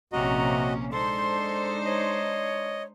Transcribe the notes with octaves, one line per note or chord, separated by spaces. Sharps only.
A#1 C3 A#3 C#4 F#4 D#5 A#5
G#3 D4 D#4 A4 C5 C6
C#5 D#5